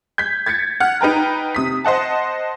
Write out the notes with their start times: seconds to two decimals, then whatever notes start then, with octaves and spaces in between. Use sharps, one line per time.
0.18 G6 G#6 B6
0.46 G#6 A6 B6 C#7
0.80 F#5 F6
1.01 D#4 B4 G5 A#5
1.55 C3 D#6 B6
1.84 C5 D#5 F#5 A5